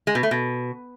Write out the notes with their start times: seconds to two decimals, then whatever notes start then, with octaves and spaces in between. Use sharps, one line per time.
0.07 G#3
0.15 B2
0.23 A3
0.31 B2